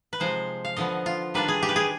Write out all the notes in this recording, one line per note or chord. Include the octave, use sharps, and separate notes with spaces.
B4
C3 F3 G#3 C5
F5
D3 F3 B3 D#5
F4
D#3 G3 D4 F4 B4
G#4
G4
B4
G#4